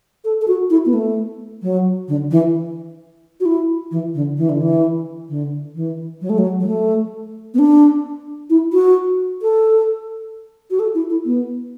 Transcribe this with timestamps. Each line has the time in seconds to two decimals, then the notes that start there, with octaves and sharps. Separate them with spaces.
0.25 A4
0.41 A4
0.48 F#4
0.70 E4
0.86 B3
0.94 A3
1.62 F#3
2.08 D3
2.31 E3
3.40 F#4
3.45 E4
3.91 E3
4.14 D3
4.38 E3
4.49 D3
4.61 E3
5.29 D3
5.75 E3
6.21 F#3
6.30 A3
6.38 F#3
6.60 F#3
6.67 A3
7.54 B3
7.59 D4
8.50 E4
8.73 F#4
9.42 A4
10.71 F#4
10.79 A4
10.95 E4
11.10 E4
11.26 B3